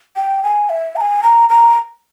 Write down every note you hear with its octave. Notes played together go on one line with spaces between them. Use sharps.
G5
G#5
E5
A#5
G#5
A#5
A#5